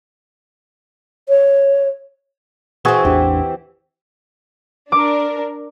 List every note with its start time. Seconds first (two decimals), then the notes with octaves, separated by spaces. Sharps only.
1.29 C#5
2.85 E3 C4 F#4 G#4
3.05 A1 E2 D4 G4
4.92 D4 A#4 D6